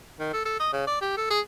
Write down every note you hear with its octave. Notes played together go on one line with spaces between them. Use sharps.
D#3
A4
A4
D#5
C#3
D5
G4
A4
G#4